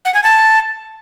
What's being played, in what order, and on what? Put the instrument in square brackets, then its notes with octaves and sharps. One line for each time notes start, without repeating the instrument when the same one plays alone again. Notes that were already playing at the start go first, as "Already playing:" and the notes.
[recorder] F#5
G#5
A5